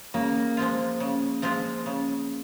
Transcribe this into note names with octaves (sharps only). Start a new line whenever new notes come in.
C#3 A#3
F3 G#3 C4 F4
C#3
F3 G#3 C4 F4
C#3